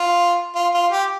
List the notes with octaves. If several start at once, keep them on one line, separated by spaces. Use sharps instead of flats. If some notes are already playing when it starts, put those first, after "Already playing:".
Already playing: F4
F4
F4
G4